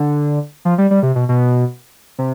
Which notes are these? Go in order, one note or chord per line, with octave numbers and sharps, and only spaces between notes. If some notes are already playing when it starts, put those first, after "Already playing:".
Already playing: D3
F3
G3
G3
C3
B2
B2
C3